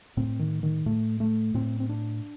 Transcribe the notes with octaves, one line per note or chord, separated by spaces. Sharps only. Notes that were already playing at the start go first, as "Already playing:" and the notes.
A2 C4
D#3
D#3
A2 A3
A3
A2 C4
C4
D4